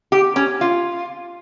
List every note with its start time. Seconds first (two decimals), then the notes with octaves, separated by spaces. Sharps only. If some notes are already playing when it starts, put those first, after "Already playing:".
0.12 G4
0.36 C#4
0.61 F4